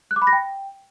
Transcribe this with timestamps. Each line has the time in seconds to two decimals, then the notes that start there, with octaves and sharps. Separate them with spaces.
0.11 F#6
0.16 D6
0.22 B5
0.27 A#6
0.32 G5